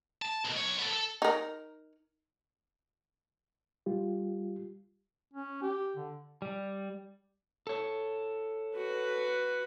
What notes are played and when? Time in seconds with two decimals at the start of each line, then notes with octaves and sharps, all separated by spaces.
0.22 A5
0.45 B1 B2
0.57 B1 C#5
0.79 B3 A4
0.93 A4
1.22 D#4 A#4
3.86 G3 F4 G4
5.34 C#4
5.62 G4
5.96 D3
6.42 G3
7.67 A4 C#5
8.74 F#4 B4